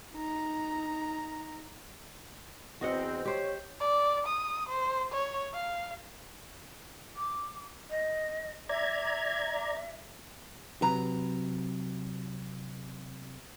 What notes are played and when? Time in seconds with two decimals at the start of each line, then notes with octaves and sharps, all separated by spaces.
0.13 D#4 A#5
2.81 E2 C4 F#4 D#5 F#5
3.25 G4 C5 C#5
3.80 D5
4.27 D#6
4.69 C5
5.12 C#5
5.54 F5
7.15 D6
7.90 D#5
8.69 D5 E5 A#5 G#6
10.82 C3 F#3 B4 A#5